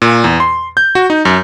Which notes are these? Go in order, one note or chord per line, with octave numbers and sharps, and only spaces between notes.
A#2
E2
C6
G6
F#4
D#4
F#2